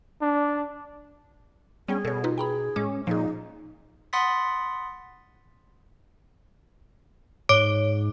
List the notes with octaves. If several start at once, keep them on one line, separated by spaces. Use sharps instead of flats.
D4
G3 B3 C#4 G#4 G5
B2 A4 C#5
D#4 F4 B4
G#4 G5 A#5 B5
A2 G#3 C#4 D6
A#2 F3 D#4 G#4
F#5 B5 C6 D#6 A6 B6
G#2 C#5 D6 D7